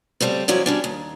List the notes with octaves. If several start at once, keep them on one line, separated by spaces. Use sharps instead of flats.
C#3 G3 A3 C4
F3 F#3 C#4 E4 D5
G3 C#4 D4
D#2